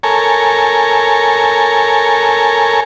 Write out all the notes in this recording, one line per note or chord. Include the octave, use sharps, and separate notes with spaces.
A4 A#4 C#5 G#5